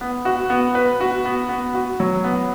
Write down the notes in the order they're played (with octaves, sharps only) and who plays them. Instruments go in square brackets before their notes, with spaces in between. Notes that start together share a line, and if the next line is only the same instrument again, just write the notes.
[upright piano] B3
F#4
B3
B4
F#4
B3
B3
F#4
F#3
B3